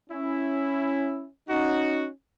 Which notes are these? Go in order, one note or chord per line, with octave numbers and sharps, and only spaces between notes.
C#4 E4
C#4 D#4 F#4